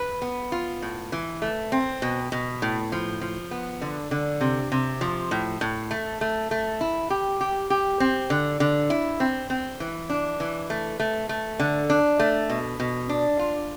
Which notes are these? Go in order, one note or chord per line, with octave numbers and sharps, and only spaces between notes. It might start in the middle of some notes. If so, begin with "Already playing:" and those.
Already playing: B4
B3
F4
A2
E3
A3
C4
B2
B2
A2
F3
F3
B3
D3
D3
C3
C3
F3
A2
A2
A3
A3
A3
E4
G4
G4
G4
C4
D3
D3
E4
C4
C4
E3
D4
E3
A3
A3
A3
D3
D4
A3
B2
B2
D4
F4